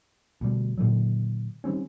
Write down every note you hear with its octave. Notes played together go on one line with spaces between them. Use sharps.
D2 B2 G3
A#2 D3 D#3 F#3
D#3 G3 C4 C#4